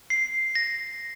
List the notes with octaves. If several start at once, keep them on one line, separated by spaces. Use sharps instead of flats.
C7
A#6